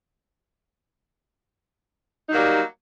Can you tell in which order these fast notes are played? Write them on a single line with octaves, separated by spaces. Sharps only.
D#4 F#3 A#3 G3